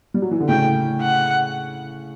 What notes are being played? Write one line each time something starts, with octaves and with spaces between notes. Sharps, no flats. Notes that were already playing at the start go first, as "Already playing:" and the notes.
G3
F#3
E3
D3
A2 C#3 G5
F#5